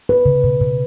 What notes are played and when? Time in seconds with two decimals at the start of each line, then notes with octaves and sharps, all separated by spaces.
0.09 B4
0.26 C#3
0.44 B2
0.61 B2